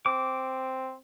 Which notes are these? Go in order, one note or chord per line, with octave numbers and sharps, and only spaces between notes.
C4 D6